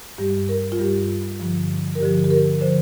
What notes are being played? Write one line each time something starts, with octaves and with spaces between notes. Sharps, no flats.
G2 G3 G4
A#4
F4
G2 G3 G4
G2 D3 F3
A#4
G2 D3 F3 G4
G4
A#4
D3 F3 C5